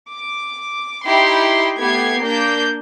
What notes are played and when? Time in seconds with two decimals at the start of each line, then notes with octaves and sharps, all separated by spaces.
0.11 D6
1.05 D#4 E4 G4 G5 C6
1.79 A3 B3 G4 G#6 C7
2.22 A#3 D4 G6